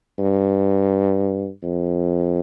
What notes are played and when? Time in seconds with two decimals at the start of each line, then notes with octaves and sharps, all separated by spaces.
0.18 G2
1.63 F2